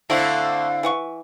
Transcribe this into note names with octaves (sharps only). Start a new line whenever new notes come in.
D3 A3 C4 E4 F5
E3 F#5 C#6